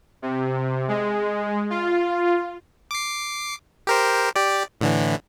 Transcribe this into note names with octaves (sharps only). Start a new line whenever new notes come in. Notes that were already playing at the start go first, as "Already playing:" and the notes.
C3
G#3
F4
D6 C7
G4 A#4 C5
G4 D5
A2 D3 E3